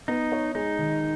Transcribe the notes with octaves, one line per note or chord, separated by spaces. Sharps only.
B3 D#4
C#5
G#3 D#4
D#3